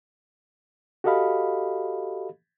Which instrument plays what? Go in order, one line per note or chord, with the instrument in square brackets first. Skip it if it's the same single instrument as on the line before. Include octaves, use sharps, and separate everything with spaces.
[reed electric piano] F#4 G4 A4 D#5 F5 B5